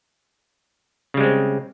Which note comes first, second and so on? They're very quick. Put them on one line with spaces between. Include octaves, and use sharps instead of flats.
C#3 G3 G#3 C4